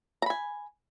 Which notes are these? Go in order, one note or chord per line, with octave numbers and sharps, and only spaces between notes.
G#5 A#5 B5